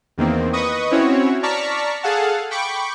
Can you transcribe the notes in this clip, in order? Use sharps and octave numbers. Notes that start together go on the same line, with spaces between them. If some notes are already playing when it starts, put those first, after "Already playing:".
E2 D#3 A#3 C4
B4 D#5 C#6 D#6
C4 C#4 E4 F#4 C#5
D5 A5 A#5 C#6 F6 B6
G#4 A4 F5 F#5 A5
G5 B5 C#6 D6